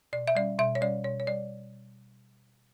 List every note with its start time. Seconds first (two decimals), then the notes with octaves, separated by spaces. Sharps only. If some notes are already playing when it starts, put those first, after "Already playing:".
0.13 B2 D5
0.28 E5
0.35 G3 C#4 D5
0.58 B2 E5
0.75 C#5
0.81 G3 C#4 D5
1.04 B2 C#5
1.20 C#5
1.27 G3 D5